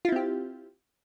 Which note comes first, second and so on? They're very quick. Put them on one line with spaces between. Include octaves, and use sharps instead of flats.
F4 E4 C4 G4